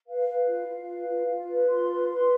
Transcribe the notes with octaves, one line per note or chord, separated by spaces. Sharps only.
B4 F5
B4
F4
F4
B4
F4
F4
B4
F4 C6
B4
B4